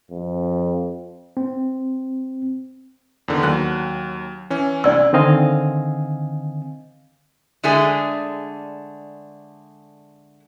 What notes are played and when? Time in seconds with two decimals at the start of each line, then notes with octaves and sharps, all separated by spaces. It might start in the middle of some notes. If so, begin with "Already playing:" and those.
0.11 F2
1.37 C4
3.28 E2 D3 D#3
3.43 D#2 F#3 F#6
4.50 E3 C#4
4.84 C2 D4 D5 E6
5.13 D3 D#3 C4 D#5 F5 G#5
7.64 D3 G#3 A3 D4 G#4